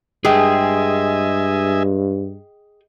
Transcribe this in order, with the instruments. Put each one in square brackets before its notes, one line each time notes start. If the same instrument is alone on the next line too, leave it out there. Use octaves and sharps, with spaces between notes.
[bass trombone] G2 [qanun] G#3 [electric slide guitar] G#4 G5 [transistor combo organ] D#5 E5 G#5